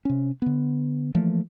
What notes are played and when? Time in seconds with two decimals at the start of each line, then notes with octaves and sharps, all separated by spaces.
0.05 C3 C#4
0.42 D3 B3
1.15 E3 F3 A3 A#3